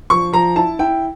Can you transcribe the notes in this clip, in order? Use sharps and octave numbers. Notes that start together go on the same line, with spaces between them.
F3 C#6
F3 A#5
E4 A5
E4 G5